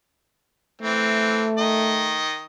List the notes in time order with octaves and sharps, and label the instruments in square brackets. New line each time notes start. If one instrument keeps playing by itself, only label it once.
[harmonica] E3 C4 [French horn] A3
[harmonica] D#3 D#5